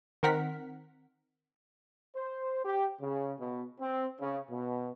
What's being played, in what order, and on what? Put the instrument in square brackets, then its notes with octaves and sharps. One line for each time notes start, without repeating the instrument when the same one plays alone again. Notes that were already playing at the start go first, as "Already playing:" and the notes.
[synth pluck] D#3 C4 A#4 F#5 F6 B6
[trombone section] C5
G4
C#3
B2
C4
C#3
B2